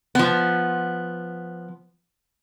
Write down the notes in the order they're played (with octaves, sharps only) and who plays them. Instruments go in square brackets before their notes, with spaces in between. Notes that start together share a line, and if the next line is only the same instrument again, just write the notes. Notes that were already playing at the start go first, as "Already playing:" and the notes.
[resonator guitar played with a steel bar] F3 B3